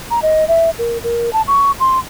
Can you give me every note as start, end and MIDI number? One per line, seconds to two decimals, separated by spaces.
0.11 0.19 82
0.22 0.47 75
0.48 0.70 76
0.78 0.98 70
1.04 1.33 70
1.33 1.42 81
1.48 1.71 85
1.80 1.99 84